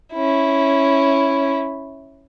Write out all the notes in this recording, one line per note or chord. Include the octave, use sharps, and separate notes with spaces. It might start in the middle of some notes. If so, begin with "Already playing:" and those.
C#4 E4